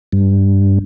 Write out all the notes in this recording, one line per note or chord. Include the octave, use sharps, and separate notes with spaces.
G2